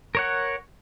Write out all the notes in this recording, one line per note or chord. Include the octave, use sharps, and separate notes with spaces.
A#4 C#5 F#5